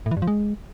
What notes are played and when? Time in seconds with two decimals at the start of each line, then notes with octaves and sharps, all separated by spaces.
0.06 A2
0.11 E3
0.17 G2
0.22 F3
0.27 G#3